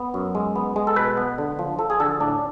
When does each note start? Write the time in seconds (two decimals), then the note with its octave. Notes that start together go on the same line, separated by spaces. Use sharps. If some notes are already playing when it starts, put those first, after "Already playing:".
Already playing: B3
0.14 F#2
0.35 G#3
0.56 B3
0.76 G#3
0.87 A4
0.96 B2 B4
1.17 B3
1.38 D3
1.59 F3
1.79 F3 A4
1.90 G#4
2.00 D3 A4
2.20 A2 D4